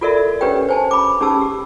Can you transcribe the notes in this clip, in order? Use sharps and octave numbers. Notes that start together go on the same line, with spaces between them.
F4 F#4 A4 A#4 D5 E5
C#4 D4 G4 B4 C#5 G5
C5 G#5 A5
B5 D6
C#4 D#4 G4 G#4 A5 E6
G4